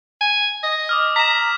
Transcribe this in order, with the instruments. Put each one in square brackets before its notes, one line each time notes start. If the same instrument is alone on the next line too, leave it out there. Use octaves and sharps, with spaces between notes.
[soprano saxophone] G#5
D#5
[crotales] D6 D#6 F6
[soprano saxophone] A#5 [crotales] B6 E7